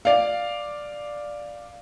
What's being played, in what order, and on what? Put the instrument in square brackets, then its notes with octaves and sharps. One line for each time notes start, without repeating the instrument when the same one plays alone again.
[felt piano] D5 F5